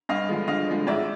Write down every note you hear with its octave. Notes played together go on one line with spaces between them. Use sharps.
G2 D#5 F5
D3 F3 G#3
G2 D#5 F5
D3 F3 G#3
G#2 D5 E5